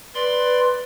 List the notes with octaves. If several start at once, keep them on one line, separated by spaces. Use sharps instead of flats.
B4 D5 C6